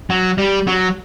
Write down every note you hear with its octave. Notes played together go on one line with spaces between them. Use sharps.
F#3
G3
F#3